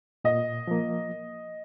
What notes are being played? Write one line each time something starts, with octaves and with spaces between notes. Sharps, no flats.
A#2 D#5
F3 A#3